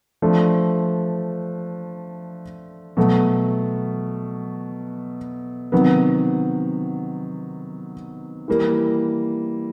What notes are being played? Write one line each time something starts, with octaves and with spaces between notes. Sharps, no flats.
F3 A3 D4
B2 F#3 A3
C3 D#3 F#3 B3
E3 G3 A#3